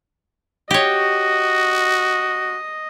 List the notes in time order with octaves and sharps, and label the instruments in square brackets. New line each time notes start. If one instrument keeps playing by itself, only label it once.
[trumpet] F#4 [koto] G4 C#5 [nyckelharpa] D#5